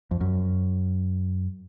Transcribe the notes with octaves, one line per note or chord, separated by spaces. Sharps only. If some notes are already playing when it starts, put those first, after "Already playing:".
F2
F#2